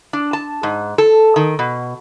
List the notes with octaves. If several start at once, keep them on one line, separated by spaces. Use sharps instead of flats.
D4
A5
G#2
A4
D#3
B2